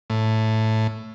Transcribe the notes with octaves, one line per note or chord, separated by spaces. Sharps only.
A2